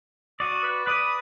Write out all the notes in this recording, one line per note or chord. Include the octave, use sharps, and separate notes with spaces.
F#4 D5 D#6
B4
B4 D5 D#6